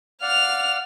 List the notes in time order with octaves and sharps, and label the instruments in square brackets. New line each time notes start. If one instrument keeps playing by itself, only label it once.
[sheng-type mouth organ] D5 F5 F#5 [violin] F6 F7